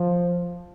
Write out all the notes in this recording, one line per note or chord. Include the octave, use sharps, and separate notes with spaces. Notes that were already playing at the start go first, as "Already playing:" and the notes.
Already playing: F3